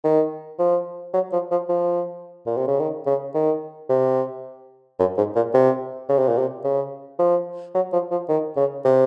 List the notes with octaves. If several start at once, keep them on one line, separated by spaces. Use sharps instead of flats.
D#3
F3
F#3
F3
F3
F3
A#2
C3
C#3
D#3
C#3
D#3
C3
F#2
G#2
A#2
C3
C#3
C3
A#2
C3
C#3
F3
F#3
F3
F3
D#3
C#3
C3